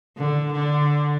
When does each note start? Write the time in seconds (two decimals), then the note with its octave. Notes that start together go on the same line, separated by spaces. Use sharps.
0.18 D3
0.53 D3